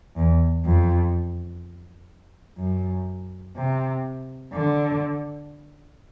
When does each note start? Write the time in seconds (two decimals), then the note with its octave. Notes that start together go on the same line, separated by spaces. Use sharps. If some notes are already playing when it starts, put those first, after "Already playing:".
0.17 E2
0.65 F2
2.58 F#2
3.56 C3
4.53 D3